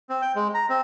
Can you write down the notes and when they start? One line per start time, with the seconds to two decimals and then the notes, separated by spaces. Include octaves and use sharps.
0.09 C4
0.22 G5
0.35 G#3
0.54 A#5
0.70 C4